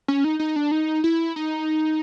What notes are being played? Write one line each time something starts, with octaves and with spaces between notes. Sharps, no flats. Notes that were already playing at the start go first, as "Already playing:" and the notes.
C#4
D#4
D#4
D4
D#4
E4
D#4